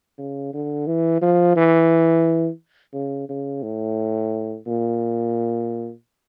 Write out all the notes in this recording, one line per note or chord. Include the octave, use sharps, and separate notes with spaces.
C#3
D3
E3
F3
E3
C#3
C#3
A2
A#2